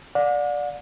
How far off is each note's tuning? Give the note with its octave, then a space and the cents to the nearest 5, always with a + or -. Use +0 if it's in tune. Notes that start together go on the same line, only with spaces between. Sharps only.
D5 +0 F#5 -45